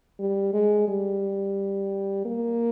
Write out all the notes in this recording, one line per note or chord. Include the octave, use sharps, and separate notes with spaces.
G3
G#3
G3
A#3